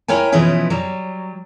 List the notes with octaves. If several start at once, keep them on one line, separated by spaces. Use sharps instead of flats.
E4 A#4 C#5 G5 G#5
B2 E3 F3 C#4 E4 G#4
F#3 G3